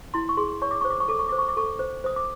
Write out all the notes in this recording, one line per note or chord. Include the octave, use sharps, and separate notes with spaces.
E4 C6
C#6
G#4 C6
C#5 C#6
D6
C5 C#6
D6
C#6
A4 D6
C#6
C5 D6
C#6
D6
A4 C#6
C5
C5 D#6
D6